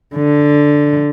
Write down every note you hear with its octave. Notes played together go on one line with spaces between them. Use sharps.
D3